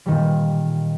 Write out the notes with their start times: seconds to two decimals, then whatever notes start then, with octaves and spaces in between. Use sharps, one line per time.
0.06 A#2 D#3 G3